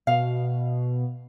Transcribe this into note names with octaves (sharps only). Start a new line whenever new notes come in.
B2 F5